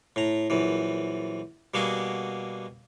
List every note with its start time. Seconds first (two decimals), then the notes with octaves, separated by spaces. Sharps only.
0.16 A2 A#5
0.50 A#1 F#2 E3
1.74 B2 G3 A#3 F#4 G#4